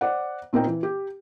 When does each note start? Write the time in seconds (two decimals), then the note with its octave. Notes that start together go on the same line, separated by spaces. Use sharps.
0.01 C5 D5 F#5
0.53 A#2 C4 D#4 A#4 G5
0.67 E3
0.83 G4